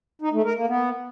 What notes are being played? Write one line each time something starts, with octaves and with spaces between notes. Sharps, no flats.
D#4
A3
A#4
A#3
B3